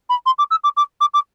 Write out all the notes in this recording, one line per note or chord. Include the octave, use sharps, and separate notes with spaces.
B5
C6
D6
E6
D6
D6
D6
D6